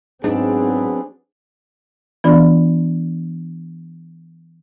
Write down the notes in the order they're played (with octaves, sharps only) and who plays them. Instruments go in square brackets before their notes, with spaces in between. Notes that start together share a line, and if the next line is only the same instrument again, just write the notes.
[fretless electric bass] G#2 [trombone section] F#3 B3 G#4 [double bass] C4 [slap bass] D4
[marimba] E3 B3 D4 F4 D5